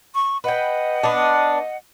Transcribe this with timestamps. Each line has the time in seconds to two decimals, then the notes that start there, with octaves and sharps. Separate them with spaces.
0.13 C#6
0.44 B4 D#5 F#5 G5
1.03 B3 D4